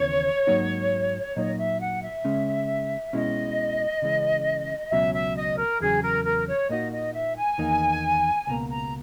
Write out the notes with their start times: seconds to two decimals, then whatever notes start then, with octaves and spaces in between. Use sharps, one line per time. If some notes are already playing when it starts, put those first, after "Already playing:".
Already playing: D#2 C#3 E3 B3 C#5
0.47 G#2 F#3 A#3 D#4 F#4
1.36 A#2 F#3 A#3 D#4 D#5
1.58 E5
1.80 F#5
2.03 E5
2.25 C#3 G#3 C#4
3.13 B2 G#3 C#4 E4 D#5
4.02 C#3 E3 G#3 C#4
4.91 C#2 B2 F#3 C#4 E5
5.14 E5
5.36 D#5
5.59 A#4
5.80 E2 C#3 F#3 G#4
6.02 A#4
6.25 A#4
6.47 C#5
6.69 A#2 A#3 D#4 F#4 D#5
6.92 D#5
7.14 E5
7.36 G#5
7.58 E2 D#3 A#3 D#4
8.47 C#2 B2 A#3 A#5
8.69 A#5